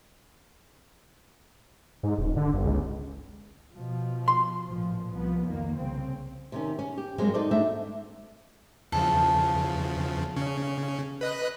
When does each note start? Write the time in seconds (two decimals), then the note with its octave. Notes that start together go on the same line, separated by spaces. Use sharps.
2.03 G#2
2.18 D#1
2.36 D3
2.54 G1
2.65 C#2
3.74 B2 F3
4.28 C6
4.67 A1 A#2 F3
5.12 C2 F3 B3
5.47 F2 D#3 A#3
5.78 C2 C#3 C4
6.52 C3 D#3 C#4
6.79 C#4
6.98 G4
7.18 G2 F#3 G#3 A#3 C4 C#4
7.34 D#4 A4 C5 D5
7.51 A3 D4 D#4 F#4 E5
8.92 E2 C#3 F3 A4
10.36 C#3 C#4
11.21 B4 D#5 F#6